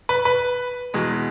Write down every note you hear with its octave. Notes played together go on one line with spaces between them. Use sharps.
B4
B4
E2 B2 G#3